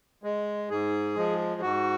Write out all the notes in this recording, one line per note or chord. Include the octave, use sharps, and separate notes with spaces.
G#3
G#2 G#4
F3 G#3
G#2 F#4